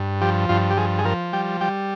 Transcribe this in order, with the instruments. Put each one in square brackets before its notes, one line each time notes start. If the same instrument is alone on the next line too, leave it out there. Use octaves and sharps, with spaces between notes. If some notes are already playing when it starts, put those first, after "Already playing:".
Already playing: [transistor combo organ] G2
F3 G4
G2 F4
G4
F3 G#4
G#4
F3 A#4
G3 G5
G3 G5